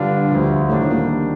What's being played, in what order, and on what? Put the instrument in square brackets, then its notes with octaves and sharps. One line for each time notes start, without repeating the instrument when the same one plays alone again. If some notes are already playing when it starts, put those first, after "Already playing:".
Already playing: [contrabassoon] G2 [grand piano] D3 G3 D4 F4
[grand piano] D2 D3 F3
[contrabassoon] A2 [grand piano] C3 D#3 G3 D4
[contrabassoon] A2
A#2